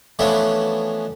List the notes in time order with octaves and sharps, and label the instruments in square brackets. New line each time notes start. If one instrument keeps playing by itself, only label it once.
[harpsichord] E3 F3 A3 B3 C#4 D4